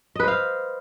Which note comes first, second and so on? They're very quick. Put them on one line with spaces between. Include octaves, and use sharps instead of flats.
D#5 B4 C5 F5